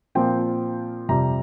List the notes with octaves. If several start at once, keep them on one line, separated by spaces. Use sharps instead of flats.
A#2 F3 C4 F4 G5
F2 C3 G3 A#5